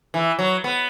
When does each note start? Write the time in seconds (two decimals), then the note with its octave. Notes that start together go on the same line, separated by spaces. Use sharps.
0.14 E3
0.39 F#3
0.64 B3